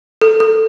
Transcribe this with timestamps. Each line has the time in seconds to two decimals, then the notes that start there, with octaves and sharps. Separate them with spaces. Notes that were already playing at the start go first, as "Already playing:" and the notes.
0.22 A4
0.40 A4